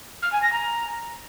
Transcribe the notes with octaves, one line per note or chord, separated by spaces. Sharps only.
F6
G#5
A#6
A#5